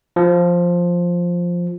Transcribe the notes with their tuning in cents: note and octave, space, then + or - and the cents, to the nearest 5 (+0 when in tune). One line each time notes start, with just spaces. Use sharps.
F3 +5